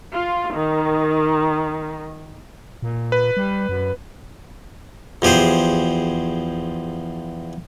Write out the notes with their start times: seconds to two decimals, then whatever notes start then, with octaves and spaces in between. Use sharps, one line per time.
0.13 F4
0.53 D#3
2.82 A#2
3.12 B4
3.37 G3
3.69 F#2
5.22 E2 F3 G4 G#4 C5